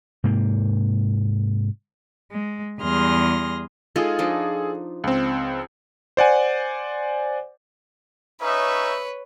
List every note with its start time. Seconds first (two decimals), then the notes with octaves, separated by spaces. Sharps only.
0.24 G#2 C3 A#3
2.32 G#3
2.81 E2 G3 G#4 C6 F6 A#6
3.96 G#3 D#4 F4 G#4 A4
4.19 F3 D4 D#4
5.04 C#2 C4
6.17 C5 D5 F#5 G#5
8.41 C#4 D#4 B4 C#5 E5